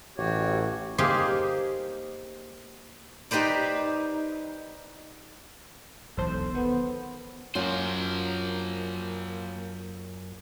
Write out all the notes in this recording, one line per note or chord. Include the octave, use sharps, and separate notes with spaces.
A1 F#4 G4 C#5
A#3 D#4 G4 G#4 C5
D#4 G4 B4 C5 D5
E1 B1 A4 C5
D#3 B3
F#2 A#3 F4 C5 F#5